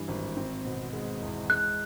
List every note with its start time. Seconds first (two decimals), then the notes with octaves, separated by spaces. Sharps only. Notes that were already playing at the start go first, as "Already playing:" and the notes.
Already playing: G2 E3 G3
0.08 G#1
0.36 C4
0.65 B2
0.93 G#3
1.21 E2
1.50 G#3 F#6